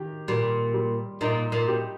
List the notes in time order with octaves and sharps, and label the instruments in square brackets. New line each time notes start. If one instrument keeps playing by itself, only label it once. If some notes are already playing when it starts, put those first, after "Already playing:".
Already playing: [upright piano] D#3 G4
[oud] A#2 [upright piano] G3
[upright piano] G3
[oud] A#2 [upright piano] D#4
[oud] A#2
[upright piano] G4